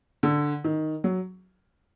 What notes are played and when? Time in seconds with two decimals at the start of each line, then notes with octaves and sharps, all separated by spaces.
0.23 D3
0.64 D#3
1.04 F#3